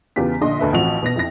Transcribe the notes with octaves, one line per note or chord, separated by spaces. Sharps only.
E2 C#3 B3 F4 G4 B6
A#1 D3 D#5 C6
D2 A4 B4 E5
A1 F3 C4 F#4 F#5 F7
B2 B3 A#6
F2 E4 E5 A#6